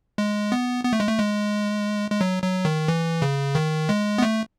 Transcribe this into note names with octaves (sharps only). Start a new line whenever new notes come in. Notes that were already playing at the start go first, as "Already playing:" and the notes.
G#3
B3
B3
A3
G#3
A3
G#3
G#3
F#3
F#3
D#3
E3
C#3
D#3
G#3
B3
A3